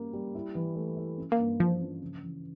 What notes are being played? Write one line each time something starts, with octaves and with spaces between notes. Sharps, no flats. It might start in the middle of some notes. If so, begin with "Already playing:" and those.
Already playing: G3 A#3 C#4
G3
E4
E3
A3
E4
C#4
A#3
G2
E3 F3
C#4
C#3
E3